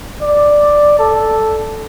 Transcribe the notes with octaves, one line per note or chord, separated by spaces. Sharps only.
D5
A4